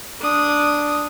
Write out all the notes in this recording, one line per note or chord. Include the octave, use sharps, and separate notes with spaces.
D4 D#6